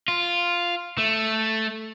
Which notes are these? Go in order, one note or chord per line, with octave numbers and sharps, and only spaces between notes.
F4
A3